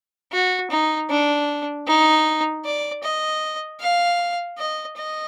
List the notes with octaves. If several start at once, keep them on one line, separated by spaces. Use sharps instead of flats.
F#4
D#4
D4
D#4
D5
D#5
F5
D#5
D#5